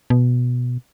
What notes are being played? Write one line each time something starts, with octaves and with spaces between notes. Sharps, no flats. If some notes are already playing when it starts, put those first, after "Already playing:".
B2